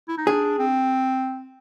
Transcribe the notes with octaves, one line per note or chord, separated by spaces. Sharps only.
E4
D#4
D4 G#4
C4